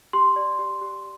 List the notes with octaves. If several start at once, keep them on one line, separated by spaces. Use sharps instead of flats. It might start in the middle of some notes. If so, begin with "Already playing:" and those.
G4 C6
D5
G4
G4